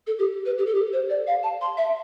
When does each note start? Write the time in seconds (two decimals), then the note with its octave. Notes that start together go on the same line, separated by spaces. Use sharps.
0.07 A4
0.19 G4
0.46 B4
0.58 G4
0.66 A4
0.75 G4
0.93 C5
1.10 D5
1.27 F5
1.43 A5
1.61 C6
1.77 E5